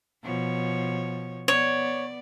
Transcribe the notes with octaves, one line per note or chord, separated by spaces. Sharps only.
B2 F3 C#5
B3 C#5 D5